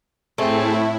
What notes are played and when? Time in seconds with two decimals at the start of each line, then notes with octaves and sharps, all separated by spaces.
0.38 A2 A3 C4 E4 G#4 A4